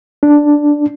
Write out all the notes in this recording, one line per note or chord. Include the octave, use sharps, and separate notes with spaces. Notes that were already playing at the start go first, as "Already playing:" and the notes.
D4